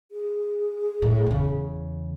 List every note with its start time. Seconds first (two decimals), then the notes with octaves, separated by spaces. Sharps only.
0.12 G#4
1.02 A2
1.26 E2 C#3